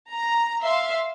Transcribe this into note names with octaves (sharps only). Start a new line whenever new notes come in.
A#5
E5 F5 C6